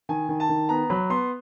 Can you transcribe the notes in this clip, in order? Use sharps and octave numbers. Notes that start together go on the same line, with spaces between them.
D#3 G#5
D#3
A5
D#3
B3 A#5
F#3 B5
B3 C6